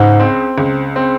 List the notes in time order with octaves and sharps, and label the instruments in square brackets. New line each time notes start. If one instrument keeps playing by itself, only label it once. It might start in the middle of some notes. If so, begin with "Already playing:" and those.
Already playing: [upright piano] C#2 [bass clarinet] G#2
[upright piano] C4
C#2
C4